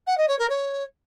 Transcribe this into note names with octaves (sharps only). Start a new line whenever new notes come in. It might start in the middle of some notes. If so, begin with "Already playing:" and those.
F#5
D#5
C#5
A#4
C#5